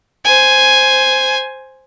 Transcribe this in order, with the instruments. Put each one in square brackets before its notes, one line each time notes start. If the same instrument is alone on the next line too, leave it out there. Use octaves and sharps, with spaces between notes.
[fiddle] C5 G#5